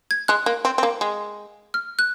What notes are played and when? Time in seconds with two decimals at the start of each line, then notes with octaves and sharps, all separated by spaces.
0.11 G#6
0.28 G#3 F#6
0.46 A#3
0.65 C4
0.78 C4
0.83 A#3
1.01 G#3
1.74 F6
1.99 F#6